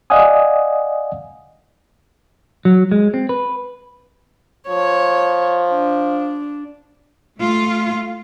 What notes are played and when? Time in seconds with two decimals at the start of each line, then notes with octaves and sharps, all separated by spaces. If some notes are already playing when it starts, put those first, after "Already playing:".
0.10 D5 D#5 F5 F#5 G#5 D#6
2.65 F#3
2.92 G#3
3.14 C4
3.29 B4
4.69 F3 C#5
5.71 D4
7.39 A3 F4